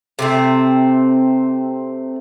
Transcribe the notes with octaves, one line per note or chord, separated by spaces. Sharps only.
C3 A3 C4